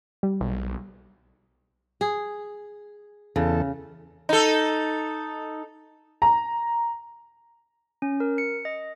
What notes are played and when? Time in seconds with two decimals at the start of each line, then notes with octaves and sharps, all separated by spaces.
0.23 G3
0.41 B1
2.01 G#4
3.36 E2 C#3 A4
4.29 D#4 A4
6.22 A#5
8.02 C#4
8.20 A#4
8.38 C#7
8.65 D#5